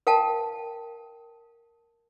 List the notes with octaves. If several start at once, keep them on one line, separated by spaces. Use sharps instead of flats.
A#4 F5 G5 A5